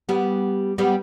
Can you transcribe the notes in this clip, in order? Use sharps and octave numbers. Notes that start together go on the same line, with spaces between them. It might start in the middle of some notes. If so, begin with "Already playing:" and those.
G3 B3
G3 B3